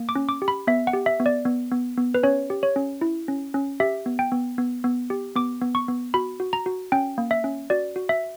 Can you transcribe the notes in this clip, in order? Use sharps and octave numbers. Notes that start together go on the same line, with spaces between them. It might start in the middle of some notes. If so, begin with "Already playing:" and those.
Already playing: A#3
D6
C#4
D6
G4
B5
B3 E5
F#5
G4
E5
B3
D5
B3
B3
B3
B4
C#4 C#5
G4
C#5
C#4
E4
C#4
C#4
G4 E5
B3
G5
B3
B3
B3
G4
B3 D6
B3
C#6
B3
F#4 B5
F#4
A#5
F#4
C#4 G5
A#3
E5
C#4
F#4 D5
F#4
E5